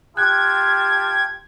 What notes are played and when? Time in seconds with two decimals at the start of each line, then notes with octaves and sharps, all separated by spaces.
0.17 F4 G4 G5 A5 F#6 G#6